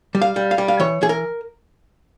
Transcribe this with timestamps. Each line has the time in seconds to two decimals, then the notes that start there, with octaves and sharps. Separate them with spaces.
0.15 G3
0.22 F5
0.36 G3
0.51 F5
0.58 G3
0.68 F5
0.80 E3 C#5
1.02 E3 G#4
1.09 A#4